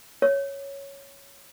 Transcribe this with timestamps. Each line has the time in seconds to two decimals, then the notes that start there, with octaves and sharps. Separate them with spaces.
0.22 C#5